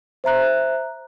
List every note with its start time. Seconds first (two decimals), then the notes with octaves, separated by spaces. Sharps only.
0.24 C5 E5 A#5 F#6